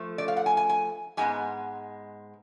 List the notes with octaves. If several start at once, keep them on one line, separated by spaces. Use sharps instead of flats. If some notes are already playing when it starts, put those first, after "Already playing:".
Already playing: F3 A3
D5
F5
F#5
G#5
G#5
G#5
G#2 G#3 B3 G#5